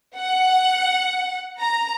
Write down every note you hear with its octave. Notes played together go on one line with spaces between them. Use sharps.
F#5
A#5